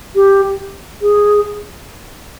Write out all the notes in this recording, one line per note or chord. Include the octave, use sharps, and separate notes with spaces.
G4
G#4